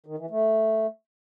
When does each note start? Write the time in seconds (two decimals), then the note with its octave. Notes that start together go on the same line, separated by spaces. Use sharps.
0.06 D#3
0.18 E3
0.30 A3